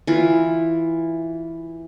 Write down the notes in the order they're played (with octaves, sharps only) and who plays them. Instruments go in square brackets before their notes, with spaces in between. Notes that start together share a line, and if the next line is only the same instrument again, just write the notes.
[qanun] E3 F4